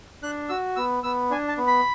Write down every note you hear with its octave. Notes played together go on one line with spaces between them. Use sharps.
D4 F#6
F#4 E6
B3 E6
B3 E6
D4 G#5
A5
B3
B5